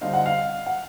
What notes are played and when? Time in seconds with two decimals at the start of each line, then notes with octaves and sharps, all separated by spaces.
0.01 D3 G3 C4 D#4 F5
0.14 F#5
0.26 F5
0.67 F#5